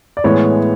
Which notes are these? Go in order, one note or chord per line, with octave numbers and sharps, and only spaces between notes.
D5
A2 E3 G#3 B3 C#5